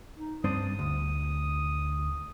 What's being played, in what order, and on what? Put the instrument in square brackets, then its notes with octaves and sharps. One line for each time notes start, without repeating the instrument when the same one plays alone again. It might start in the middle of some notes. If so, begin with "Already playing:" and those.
[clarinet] D#4
[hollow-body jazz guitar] G2 C4 D4 [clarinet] D#6
[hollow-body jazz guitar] D2